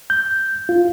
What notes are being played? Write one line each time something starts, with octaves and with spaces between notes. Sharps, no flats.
G6
F4